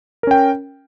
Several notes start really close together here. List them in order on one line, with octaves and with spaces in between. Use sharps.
A#4 C#4 G5